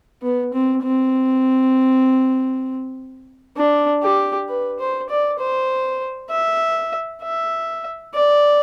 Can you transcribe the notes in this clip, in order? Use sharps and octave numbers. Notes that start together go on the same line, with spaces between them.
B3
C4
C4
D4
G4
B4
C5
D5
C5
E5
E5
D5